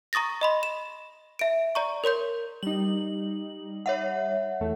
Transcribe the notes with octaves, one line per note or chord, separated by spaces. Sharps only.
A#5 C#6 D#6 A6 A#6
D#5 B5 C6
E7
E5 D7
D5 A#5 C#6
A#4 C#5 C6 G6
G3 D#4 F#7
C#5 E5 F#5
E2 A3